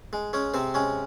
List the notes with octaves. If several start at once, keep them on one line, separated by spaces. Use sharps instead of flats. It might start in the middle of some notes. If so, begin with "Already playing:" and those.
G#3
G#3 C#4 C#5
C3 C4 C5
G#3 C#4 C#5